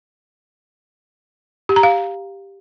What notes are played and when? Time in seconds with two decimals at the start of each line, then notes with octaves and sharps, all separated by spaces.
1.69 G4
1.76 A#5
1.83 F5